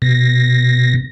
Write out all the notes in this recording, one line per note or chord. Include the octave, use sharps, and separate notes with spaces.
B2 A#6